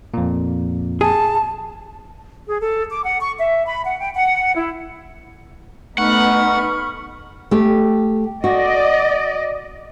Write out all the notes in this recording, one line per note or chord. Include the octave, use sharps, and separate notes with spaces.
F2 A#2
G#4 A5
G#4
A4
D6
F#5
C#6
E5
B5
F#5
G5
F#5
E4
A3 B3 D#4 F#5 B5 C#6 F6
A3 G4
F#4 D5 D#5